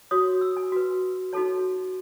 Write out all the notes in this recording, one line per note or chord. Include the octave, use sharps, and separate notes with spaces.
F#4 C#5 D#6
E6
G#5
F#4 B4
D#4 F#4 A4 C#5 A5